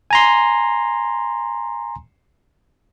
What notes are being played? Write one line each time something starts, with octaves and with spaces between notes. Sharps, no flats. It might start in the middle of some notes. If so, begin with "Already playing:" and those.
G#5 A#5 C6